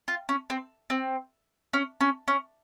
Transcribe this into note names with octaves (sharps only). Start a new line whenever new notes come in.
F4
C#4
C4
C4
C#4
C#4
C#4